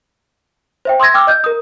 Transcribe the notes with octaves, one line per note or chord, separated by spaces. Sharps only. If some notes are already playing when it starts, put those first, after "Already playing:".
C5 E5 G5
C6 D#6 E6 G#6 A#6
G5 D6 E6 F6
D#5 G6
A#4 D#6